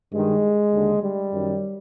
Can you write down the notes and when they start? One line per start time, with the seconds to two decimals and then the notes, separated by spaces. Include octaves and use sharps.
0.13 G2 D#3 G#3
0.72 D#2 D3
1.03 G3
1.31 F#2 D#3